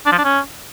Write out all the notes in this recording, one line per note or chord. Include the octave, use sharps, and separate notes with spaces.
D4
F3
D4
C#4